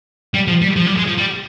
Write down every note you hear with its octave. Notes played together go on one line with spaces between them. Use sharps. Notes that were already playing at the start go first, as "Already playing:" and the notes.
G3
F3
G3
F3
G3
G#3
F3
G3